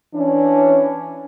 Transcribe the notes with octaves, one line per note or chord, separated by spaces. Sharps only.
E3 C#4 D4